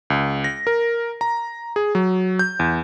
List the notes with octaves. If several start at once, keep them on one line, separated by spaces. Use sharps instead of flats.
C#2
A#6
A#4
A#5
G#4
F#3
G6
E2